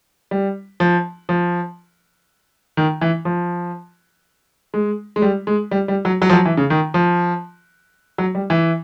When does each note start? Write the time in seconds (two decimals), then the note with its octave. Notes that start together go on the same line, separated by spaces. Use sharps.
0.31 G3
0.80 F3
1.29 F3
2.77 D#3
3.01 E3
3.25 F3
4.74 G#3
5.16 G#3
5.22 G3
5.47 G#3
5.71 G3
5.88 G3
6.05 F#3
6.22 F#3
6.29 F3
6.33 F#3
6.45 E3
6.57 C#3
6.70 D#3
6.94 F3
8.18 F#3
8.35 G3
8.50 E3